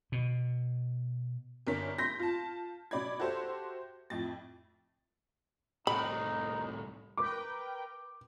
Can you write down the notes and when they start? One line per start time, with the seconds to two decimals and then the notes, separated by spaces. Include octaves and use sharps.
0.12 B2
1.67 G1 D4 A#4 C#5 B6
1.98 C6 G6 A#6 B6
2.19 F4 A5
2.91 B2 C#4 D5 B5 G#6
3.20 F#4 G4 A4 C5 E5
4.10 F2 A2 A6
5.87 C2 A2 D#4 B5
7.17 A#4 B4 G5 D6